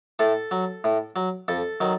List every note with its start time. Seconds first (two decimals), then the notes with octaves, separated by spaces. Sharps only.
0.19 A2 A4
0.51 F#3
0.84 A2
1.16 F#3
1.48 F2 A4
1.81 D#3 F#3